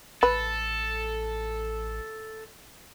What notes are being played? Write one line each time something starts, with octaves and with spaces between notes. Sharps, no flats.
A1 A4 B4